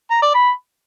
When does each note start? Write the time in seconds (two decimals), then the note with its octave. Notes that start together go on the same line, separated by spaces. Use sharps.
0.10 A#5
0.22 D5
0.34 B5